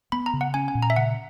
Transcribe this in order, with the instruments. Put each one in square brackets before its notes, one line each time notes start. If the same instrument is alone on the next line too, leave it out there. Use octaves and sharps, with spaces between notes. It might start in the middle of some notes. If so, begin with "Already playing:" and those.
[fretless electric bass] B3 [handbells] B5
[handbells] A#5
[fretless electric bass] C#3
[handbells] F#5
[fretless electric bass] C#4 [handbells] G#5
[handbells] G#5
[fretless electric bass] A#2
[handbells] A#5
E5
[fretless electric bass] C#3 [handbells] F#5